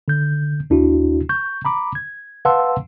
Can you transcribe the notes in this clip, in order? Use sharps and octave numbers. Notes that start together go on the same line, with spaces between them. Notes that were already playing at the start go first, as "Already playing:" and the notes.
D3 G6
D#2 D4 E4 F#4
C#6 G6
A#5 B5 D6
G#6
B4 F5 F#5 A5 C6 E6